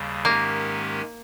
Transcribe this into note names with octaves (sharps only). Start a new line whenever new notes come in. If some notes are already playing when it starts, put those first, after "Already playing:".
Already playing: D#2 C#3 G3
G#2 D#3 G#3 A#3 C#4 G4